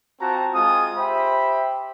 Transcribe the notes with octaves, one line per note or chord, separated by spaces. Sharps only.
C4 F4 F#4 A5 A#5
G#3 C4 F4 G#5 D#6
G4 C5 E5 G5 B5